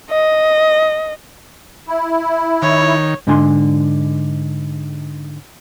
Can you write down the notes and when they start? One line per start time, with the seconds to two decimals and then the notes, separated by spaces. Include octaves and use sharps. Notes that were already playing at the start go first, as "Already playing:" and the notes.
0.10 D#5
1.88 E4
2.62 D#3 C#5
3.27 G#2 D3 G#3 D4 G#5 C6